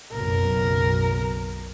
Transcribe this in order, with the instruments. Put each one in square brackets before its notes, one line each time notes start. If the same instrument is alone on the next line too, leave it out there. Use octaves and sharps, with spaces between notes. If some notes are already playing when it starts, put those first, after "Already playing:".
[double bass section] F#1 B1 [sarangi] A#4